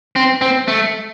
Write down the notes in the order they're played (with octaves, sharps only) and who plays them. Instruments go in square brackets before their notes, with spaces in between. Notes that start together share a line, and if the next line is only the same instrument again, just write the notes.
[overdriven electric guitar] C4
C4
A3